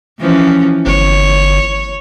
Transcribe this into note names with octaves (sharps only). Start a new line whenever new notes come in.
E3 F3 C#4
G1 C#5